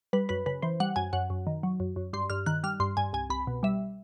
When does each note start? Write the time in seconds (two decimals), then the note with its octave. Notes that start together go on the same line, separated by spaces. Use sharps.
0.13 G3 B4
0.29 F#2 B4
0.46 C#3 B4
0.62 E3 C5
0.80 G3 F#5
0.96 F#2 G#5
1.13 F#2 F#5
1.30 F#2
1.47 D#3
1.63 F#3
1.80 F#2
1.96 F#2
2.13 G2 C6
2.30 G2 F6
2.46 D#3 F#6
2.64 G3 F6
2.80 G2 C6
2.97 G2 G#5
3.13 C2 G#5
3.30 C2 B5
3.47 B2
3.63 G3 E5